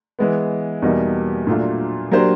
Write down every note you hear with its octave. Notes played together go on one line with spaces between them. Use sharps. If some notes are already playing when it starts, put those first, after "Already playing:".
E3 G#3 B3
E2 B2 G3 A#3 D#4
A#2 F#3 A3 D4 F4
F#3 A#3 D4 G4 C5